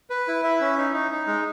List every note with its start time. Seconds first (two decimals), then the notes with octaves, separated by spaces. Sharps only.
0.10 B4
0.28 E4
0.43 E5
0.60 C#4
0.78 D#4
0.93 D#4
1.11 D#4
1.27 G#3